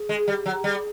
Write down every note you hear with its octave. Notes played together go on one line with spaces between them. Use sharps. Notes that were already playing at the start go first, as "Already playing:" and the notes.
Already playing: G#4
G#3
G3 G4
F#3
G4
G3 G#4